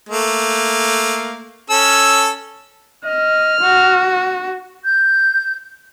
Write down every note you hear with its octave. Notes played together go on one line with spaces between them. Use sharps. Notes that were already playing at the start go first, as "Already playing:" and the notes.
A3 A#3
C#4 A4 E6
D#5 F6
F#4
G6